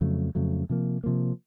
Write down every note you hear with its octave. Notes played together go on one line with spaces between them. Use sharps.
F2 C#3 F#3 A3
F2 C#3 F#3 A3
C3 F3 A#3
C3 F3 A#3